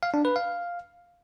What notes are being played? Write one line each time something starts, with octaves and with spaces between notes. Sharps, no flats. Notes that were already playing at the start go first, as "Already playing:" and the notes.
F5
D4
B4
F5